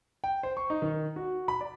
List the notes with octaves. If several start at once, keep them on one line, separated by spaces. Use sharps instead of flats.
G5
C5
C#6
D#4
D#3
F#4
B5
D5